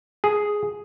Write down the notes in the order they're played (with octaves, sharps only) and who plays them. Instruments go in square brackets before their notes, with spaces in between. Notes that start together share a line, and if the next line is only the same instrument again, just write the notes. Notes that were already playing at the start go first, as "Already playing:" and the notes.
[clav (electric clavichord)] G#4